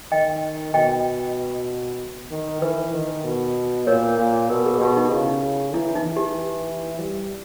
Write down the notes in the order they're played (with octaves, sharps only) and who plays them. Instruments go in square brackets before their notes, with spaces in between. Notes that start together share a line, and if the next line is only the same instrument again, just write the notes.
[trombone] D#3 [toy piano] D#5 G5
[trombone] B2 [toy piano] D#5 G5
[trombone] D#3
[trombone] E3 [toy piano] B4
[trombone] D#3
B2
[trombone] A#2 [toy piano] A#4 C#5
[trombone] A#2
[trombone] B2 [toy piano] A#4
[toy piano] G#4
[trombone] B2 [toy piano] G4
[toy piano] D#4
[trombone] C#3 [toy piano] E4
[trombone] E3 [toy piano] E4
[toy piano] D#4
[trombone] E3
[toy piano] G4
[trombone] G3